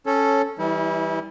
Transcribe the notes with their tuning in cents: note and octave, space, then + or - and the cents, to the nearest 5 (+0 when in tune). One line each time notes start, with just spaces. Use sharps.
C#4 -5 A4 -5 C#5 -15
E3 +0 G3 +0 E4 -35